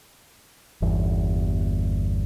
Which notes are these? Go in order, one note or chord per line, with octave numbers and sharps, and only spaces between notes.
G1 E2